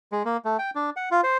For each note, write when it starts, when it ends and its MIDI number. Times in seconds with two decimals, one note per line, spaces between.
0.12 0.23 56
0.25 0.37 58
0.45 0.57 57
0.59 0.70 79
0.75 0.90 62
0.96 1.09 78
1.11 1.21 65
1.24 1.37 72